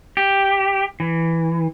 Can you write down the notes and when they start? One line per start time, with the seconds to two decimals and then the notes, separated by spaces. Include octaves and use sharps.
0.17 G4
1.00 E3